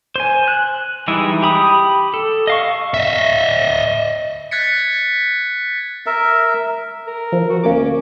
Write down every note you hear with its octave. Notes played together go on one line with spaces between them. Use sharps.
C5 G#5
F#6
E3 G3 G#3 D#4 E4
G4 B5 D#6
A4
D#5 F5 C#6
D#5 E5
F#6 G#6 A6 B6 C#7
A#4 E5
A#4
F3
F#4
D2 A#3 C#4 D6